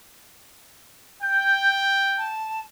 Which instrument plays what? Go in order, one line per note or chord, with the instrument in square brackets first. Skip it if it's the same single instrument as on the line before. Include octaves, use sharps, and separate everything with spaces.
[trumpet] G5 [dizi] G6
[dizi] A5